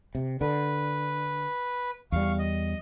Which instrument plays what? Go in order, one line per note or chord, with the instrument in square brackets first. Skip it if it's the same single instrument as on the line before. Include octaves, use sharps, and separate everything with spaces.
[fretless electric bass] C3
[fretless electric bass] D3 [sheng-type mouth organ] B4
[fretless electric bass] E2 G3 [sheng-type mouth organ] F5 C#6
[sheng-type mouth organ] D#5